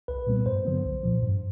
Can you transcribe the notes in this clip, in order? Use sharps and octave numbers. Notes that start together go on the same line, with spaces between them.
C2 B4
A#2 G3 B3
G2 C5
D3 F#3 B3
C2
A#2 F3
G2